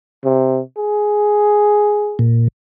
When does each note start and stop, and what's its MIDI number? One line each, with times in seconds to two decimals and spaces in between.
0.24 0.61 48
0.78 2.24 68
2.19 2.48 46